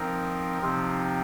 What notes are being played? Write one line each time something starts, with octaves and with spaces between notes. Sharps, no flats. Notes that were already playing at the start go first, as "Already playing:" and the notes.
Already playing: F3 C4 D#4 A#4
C3 F3 C4 D#4